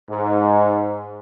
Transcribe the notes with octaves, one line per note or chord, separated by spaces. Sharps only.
G#2